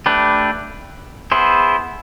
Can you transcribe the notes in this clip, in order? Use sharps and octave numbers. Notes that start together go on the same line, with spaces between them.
A3 D4 G4 B4
B3 E4 G#4 C5